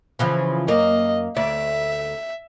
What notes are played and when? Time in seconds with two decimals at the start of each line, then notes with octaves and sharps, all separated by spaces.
0.19 C#3 E3 F3
0.68 F#2 A#3 D#5
1.36 D2 D5 E5